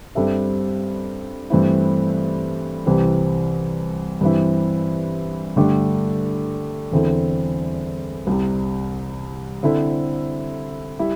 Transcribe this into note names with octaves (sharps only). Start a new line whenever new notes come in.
G2 G3 C4 A4 E5
G2 E3 A3 C4 E4
C2 C3 E3 G3 C4
G2 E3 C4 E4
G2 D3 A3 D4 G4
E2 D3 C4 E4 A4
C2 C3 G3
D3 C4 E4 A4 C5
G3 E4